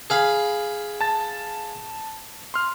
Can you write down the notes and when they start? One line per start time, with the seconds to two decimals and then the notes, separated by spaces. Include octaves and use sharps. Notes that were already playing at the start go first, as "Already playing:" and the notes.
0.10 G#4 F5 B5
1.01 A5 A6
2.54 C6 F6